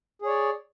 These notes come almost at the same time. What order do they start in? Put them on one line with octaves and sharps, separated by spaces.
G#4 C#5 D5